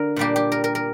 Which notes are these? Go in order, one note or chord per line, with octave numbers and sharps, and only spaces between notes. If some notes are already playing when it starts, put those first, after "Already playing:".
Already playing: D3 A#4
A#2 G3 A#3 D4 G4
G4
A#4
A#4
A#4